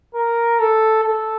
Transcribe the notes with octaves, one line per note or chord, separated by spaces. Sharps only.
A#4
A4
A4